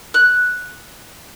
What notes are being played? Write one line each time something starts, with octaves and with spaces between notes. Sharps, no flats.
F#6